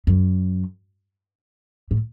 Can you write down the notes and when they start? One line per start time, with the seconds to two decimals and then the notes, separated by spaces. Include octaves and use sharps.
0.07 F#2
1.91 A2